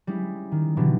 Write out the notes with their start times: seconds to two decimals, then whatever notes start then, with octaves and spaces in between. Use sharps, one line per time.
0.07 G3 G#3 C#4 E4
0.52 D#3
0.77 B2 D3 E3 F#3 G3